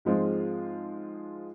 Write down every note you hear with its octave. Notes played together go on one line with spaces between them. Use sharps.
G#2 F3 G#3 C4 F4